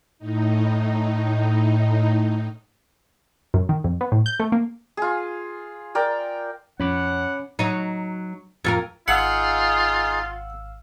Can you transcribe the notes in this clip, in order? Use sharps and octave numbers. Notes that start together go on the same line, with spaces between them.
A2 D#4
F#2
D#3
F2
B3
A2
G6
A3
A#3
F4 G#4
A#4 D5 G5
F2 C#4 C#5 F#5 B5 D6
F#3 D#4
F2 F4 A#4
G#1 D#4 F4 G#4 F5 F#5 E6